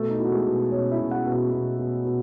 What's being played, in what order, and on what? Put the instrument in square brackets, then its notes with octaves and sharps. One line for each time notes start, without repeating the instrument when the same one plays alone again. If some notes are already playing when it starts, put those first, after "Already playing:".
Already playing: [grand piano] B2 A3 A4
D#4
B2 E4
F#4
G#3 G#4
B2
B2 C#4 C#5
E4 E5
B2
F#4 F#5
B2
F#4 F#5
B2
B2
B2